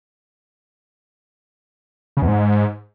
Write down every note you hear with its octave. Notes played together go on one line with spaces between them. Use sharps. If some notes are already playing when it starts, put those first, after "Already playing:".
C#3
E2
G#2